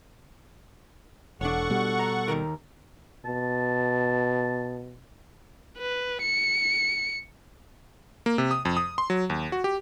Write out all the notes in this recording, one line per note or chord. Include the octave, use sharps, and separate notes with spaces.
E1 D4 A4 C#5 F#5 C#6
B2 G3
A#5
D#2 D#3 A#4
B2 A5
B4
C#7
A#3
C3
D#6
F2
D#6
C6
F#3
D#2
F#4
G4